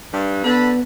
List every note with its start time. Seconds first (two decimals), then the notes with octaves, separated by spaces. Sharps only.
0.13 G2
0.44 D3 B3 A5 B5